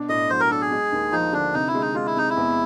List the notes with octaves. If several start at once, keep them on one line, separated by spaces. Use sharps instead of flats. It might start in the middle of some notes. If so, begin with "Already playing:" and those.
Already playing: B2 D4
A2 D#5
F#3 C5
A#4
D4 A4
G#4
G#3
D#2
F3 D#4
D3 D4
C3 D#4
E4
G#3
D#4
G#3 F4
E4
C3 D#4
E4
E2